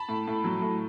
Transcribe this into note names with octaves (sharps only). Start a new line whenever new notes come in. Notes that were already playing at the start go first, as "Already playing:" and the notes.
Already playing: A5 B5
A2
A2
F#3
A2